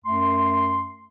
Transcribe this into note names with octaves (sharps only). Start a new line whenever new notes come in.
F#2 A3 C6